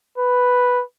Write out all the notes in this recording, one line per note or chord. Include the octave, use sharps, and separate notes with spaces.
B4